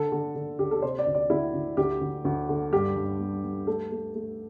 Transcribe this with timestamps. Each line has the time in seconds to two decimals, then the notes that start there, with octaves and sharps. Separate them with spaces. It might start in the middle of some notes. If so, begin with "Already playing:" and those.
Already playing: D3 A4
0.12 D3
0.36 D3
0.59 D2 G4
0.71 A4
0.82 C3 C5
0.99 D5
1.07 D2
1.15 D5
1.30 D2 E4
1.54 D2
1.77 D2 G4
2.01 D2
2.25 D2
2.49 D3
2.72 G2 G4
2.96 G2
3.20 G3
3.44 G3
3.67 A3 A4
3.91 A3
4.15 A3